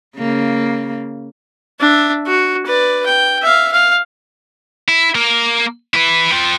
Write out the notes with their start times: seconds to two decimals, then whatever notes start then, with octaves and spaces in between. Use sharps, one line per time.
0.17 C#3 A#3
1.80 D4 E5
2.27 F#4
2.66 B4 D5
3.06 G5
3.42 E5 F5
3.72 F5
4.88 E4
5.15 A#3 A#4
5.94 E4 B4
6.32 F4 G5